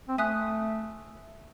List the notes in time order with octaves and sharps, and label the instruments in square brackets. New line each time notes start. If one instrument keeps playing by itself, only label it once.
[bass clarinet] C4
[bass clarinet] A3 [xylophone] E5 G#5 D#6 F#6